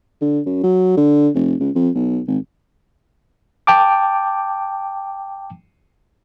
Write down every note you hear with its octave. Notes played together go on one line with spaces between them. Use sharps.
D3
F#2
F#3
D3
F1
C#2
F2
B1
G#1
G5 A5 D6